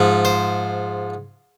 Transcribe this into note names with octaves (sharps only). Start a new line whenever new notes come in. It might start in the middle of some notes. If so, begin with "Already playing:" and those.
Already playing: G#2 F3
C5